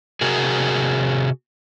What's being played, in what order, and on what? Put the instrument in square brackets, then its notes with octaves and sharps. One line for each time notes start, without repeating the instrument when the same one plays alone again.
[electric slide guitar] C3 F#4 G#4 A#4